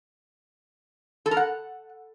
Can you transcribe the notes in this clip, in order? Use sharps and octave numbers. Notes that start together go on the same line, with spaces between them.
A4
A#4
F#5